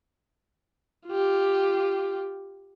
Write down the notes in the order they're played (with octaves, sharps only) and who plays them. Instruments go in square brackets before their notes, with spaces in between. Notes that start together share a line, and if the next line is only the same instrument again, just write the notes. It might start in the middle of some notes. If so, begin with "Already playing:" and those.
[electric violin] F4 G4